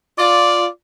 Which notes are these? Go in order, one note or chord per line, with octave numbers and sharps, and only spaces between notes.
F4 D5